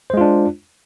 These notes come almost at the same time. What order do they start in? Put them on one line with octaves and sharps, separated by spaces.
C5 G#3 F4 D4